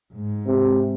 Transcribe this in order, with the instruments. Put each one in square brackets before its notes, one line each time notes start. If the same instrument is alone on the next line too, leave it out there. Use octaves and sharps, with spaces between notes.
[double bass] G#2
[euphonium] C3